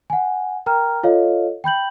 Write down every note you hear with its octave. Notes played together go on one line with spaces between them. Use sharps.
F#5 G#5
A#4 G5 A#5 F6
F4 A4 C#5 D#5 F5
G5 B5 G6 F#7